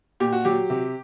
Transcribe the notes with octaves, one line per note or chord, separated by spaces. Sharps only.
A#2 G4
F#4
F#3 G4
C3